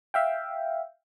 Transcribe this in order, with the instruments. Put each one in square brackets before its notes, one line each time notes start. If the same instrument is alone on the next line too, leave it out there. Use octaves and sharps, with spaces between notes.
[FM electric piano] E5 F5 G5